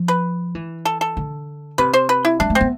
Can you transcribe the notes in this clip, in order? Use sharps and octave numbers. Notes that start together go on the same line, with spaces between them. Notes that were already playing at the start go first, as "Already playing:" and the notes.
Already playing: F3
B4
E3
A4
A4
D3
C3 B4
C5
B4
E4
G3 D4
A3
C4
B3